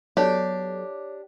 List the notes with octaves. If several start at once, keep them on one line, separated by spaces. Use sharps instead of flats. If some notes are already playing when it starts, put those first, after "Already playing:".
F#3 B3 D4 G4 A4 C#5